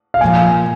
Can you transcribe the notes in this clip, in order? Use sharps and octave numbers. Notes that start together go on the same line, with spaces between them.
F5
A#2 F3 A#3 G#5